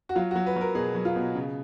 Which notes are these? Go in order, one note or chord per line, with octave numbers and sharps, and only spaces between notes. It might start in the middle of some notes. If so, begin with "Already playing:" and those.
F#4
F#3 F4
F#3 F#4
B4
F#3 A#4
B2 G#4
F#3
F4
B2
C#3